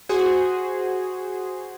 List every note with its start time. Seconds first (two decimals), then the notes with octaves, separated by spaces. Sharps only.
0.09 F#4 G#4 C5